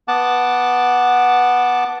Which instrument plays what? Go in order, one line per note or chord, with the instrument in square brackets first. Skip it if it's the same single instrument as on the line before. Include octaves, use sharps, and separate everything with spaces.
[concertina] B3 F#5 A5 D6